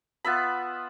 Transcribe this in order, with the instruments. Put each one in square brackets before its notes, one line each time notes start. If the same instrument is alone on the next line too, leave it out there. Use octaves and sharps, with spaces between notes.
[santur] B3 F4 E5 B5